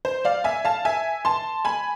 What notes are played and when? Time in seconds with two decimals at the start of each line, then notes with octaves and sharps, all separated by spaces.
0.05 C5
0.25 D5 F5
0.44 E5 G#5
0.65 F5 A5
0.85 E5 G#5
1.25 A5 C6
1.65 G#5 B5